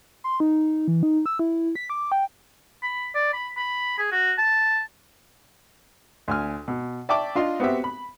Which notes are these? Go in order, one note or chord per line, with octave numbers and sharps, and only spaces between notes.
C6
D#4
E3
D#4
E6
E4
B6
D6
G5
B5
D5
B5
B5
G#4
F#4
A5
D2 G#5 F6
B2
D5 E5 G5 A5 C#6 D6
D4 F4 D#5 C6
B3 C4 F#4 G4 E5
B5